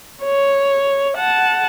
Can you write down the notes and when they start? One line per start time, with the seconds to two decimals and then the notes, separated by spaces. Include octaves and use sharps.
0.24 C#5
1.18 F#5 A5